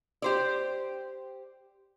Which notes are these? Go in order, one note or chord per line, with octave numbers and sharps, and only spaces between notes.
G4 C5 D5